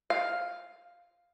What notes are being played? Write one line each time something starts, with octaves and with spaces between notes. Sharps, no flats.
F5